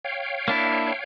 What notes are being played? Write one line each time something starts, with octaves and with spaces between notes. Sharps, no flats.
C#5 F5 G5
A#3 D4 E4